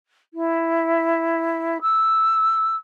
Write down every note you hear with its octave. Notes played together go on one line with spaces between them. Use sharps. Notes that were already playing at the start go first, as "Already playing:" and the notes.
E4
E6